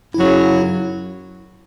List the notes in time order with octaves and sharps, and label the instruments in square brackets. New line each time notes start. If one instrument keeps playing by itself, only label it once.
[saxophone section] F#2 C#3 F#3 [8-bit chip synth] E4